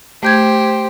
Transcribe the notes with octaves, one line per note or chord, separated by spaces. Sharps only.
A3 G4 C5 G6 G#6